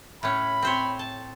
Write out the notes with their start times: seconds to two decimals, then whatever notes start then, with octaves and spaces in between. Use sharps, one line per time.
0.23 A2 C#4 B5
0.62 C4 C5 C#5
0.99 A5